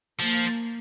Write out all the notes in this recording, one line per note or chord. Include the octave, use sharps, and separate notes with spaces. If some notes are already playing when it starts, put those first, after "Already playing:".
F3 A#3